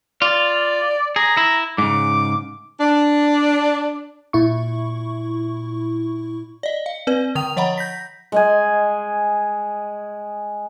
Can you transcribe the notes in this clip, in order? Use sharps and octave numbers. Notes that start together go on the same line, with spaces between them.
F4 D5
G#4 A#5
E4
G#2 C#3 D6
D4
A#2 E4 C#6
D5 D#5
F5
C4 B4 D5
D3 G5 D#6 F7
F3 C#5 D#5 F#5 A#5 B5
G6 A#6 B6
G#3 D#5 G#5